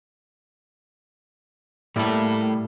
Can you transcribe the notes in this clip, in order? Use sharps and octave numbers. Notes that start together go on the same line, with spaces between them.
A2 G3 A3 A#3 E4 A4